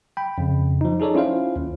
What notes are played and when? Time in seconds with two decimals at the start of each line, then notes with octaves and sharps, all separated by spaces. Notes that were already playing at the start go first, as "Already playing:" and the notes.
0.17 G5 B5
0.38 F2 C#3
0.81 F3 D#4
1.00 D#4 G#4 A4 C#5 D5
1.15 C#4 E4 F4 C5 F5
1.56 D#2